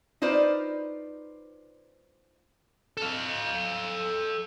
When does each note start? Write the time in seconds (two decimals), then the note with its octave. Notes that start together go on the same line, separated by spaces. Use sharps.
0.22 D#4 F4 B4 C5 D5
2.97 A4 F5